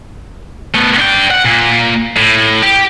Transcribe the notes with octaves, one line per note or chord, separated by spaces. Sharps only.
A3 B3
D4 G5
F#5
A#2
A2
G4